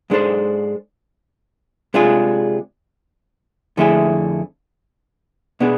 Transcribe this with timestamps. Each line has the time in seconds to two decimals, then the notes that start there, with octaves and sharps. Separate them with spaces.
0.10 G#2 G#3 D4 A4 C5
1.94 C3 G#3 D4 F4 G#4
3.77 F2 D3 A3 E4 G#4
5.60 B2 B3 D4 G#4